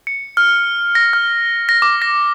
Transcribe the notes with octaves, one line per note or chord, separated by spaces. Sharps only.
C#7
F6
A#6
F6
A#6
D6
A#6